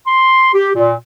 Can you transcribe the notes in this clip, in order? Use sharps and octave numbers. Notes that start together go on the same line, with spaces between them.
C6
G4
A#2